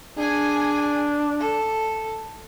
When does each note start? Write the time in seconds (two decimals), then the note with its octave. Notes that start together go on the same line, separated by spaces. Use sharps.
0.18 D4 G#4 G#5
1.40 A4